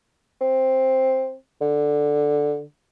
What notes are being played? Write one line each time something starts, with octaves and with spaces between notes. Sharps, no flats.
C4
D3